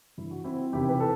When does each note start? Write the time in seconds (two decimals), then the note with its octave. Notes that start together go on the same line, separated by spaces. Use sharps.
0.17 G2 E3 E4
0.31 F#4
0.44 C4 E4
0.73 E2 C3 D#3 E4 G4
0.89 B4
1.00 A4